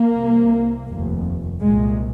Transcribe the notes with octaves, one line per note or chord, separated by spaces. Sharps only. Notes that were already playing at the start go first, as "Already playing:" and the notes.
Already playing: A#3
C2 C3
F1 D#2
C2 A#2 G#3